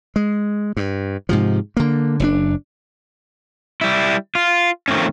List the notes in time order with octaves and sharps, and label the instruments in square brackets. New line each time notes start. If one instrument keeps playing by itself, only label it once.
[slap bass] G#3
G2
G#2 C3 F3
D3 A#3
F#1 B2 D4
[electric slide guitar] G3 E4
F4
D#3 F3 A3 C4 C#4